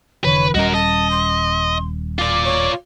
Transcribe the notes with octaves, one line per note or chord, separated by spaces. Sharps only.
F1 D3 E3 B4 C#5
D#1 G3 C#4 F#4 A#4 D#5
D#5 A5
C6
F4 D5 D6
C#5